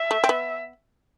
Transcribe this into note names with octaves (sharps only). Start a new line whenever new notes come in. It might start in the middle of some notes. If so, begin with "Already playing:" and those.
Already playing: E5
A3
C4
B3